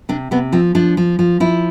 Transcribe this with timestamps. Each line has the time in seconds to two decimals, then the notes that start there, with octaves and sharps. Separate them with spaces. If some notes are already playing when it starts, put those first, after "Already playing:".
0.09 C3 D4
0.31 C3 B3
0.52 F3 C4
0.75 F3 D4
0.97 F3
1.19 F3
1.40 F3 E4